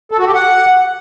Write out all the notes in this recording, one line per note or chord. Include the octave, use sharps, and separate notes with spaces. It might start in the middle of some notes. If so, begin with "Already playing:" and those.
A4
F#4
G4
F#5